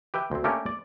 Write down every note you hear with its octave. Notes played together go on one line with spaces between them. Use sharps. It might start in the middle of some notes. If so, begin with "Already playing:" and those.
G4 B4 E5 G5
D2 C4
A3 A#3 C#4 D4 G4 A#4
D5